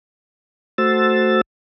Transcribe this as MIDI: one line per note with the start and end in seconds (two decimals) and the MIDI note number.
0.78 1.41 57
0.78 1.41 66
0.78 1.41 72
0.78 1.41 88
0.78 1.41 93